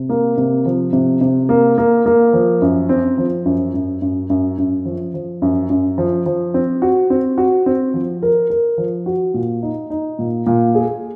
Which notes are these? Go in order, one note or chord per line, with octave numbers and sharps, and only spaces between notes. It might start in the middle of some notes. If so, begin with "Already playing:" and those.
Already playing: C3
A#3
C3
F3
C3
C3
A#3
A#3
A#3
F3
F#2
C4
F3
F#2
F#2
F#2
F#2
F#2
F3
F3
F#2
F#2
F3
F3
C4
F#4
C4
F#4
C4
F3
A#4
A#4
F3
F#4
A#2
D#4
D#4
A#2
A#2
G#4